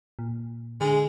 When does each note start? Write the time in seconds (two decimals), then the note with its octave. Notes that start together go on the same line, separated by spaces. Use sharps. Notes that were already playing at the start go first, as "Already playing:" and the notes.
0.19 A#2
0.81 D3 G#3